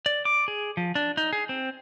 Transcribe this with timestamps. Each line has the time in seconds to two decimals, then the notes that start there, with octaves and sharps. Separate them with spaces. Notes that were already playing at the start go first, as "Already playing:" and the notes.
0.06 D5
0.25 D6
0.48 G#4
0.77 F3
0.95 D4
1.17 D#4
1.33 G#4
1.49 C4